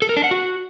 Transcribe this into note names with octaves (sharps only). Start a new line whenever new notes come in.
A4
A#4
D4
F#5
F#4